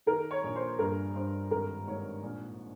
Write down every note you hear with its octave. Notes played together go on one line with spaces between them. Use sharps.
D#3 A#4
C#5
A#1
C5
G2 A#4
G2 C5
G#1 A#4
G#2 C#5
A#1